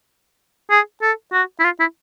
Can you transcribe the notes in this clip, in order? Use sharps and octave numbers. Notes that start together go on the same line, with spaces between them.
G#4
A4
F#4
E4
F4
E4